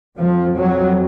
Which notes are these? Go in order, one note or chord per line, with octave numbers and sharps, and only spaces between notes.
F2 F3
F#3